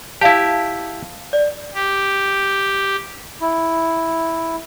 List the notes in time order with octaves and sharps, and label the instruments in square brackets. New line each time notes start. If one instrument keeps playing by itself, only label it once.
[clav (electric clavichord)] E4 G4 [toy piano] E5 F5 A5
[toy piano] D5
[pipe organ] G4
[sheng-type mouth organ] E4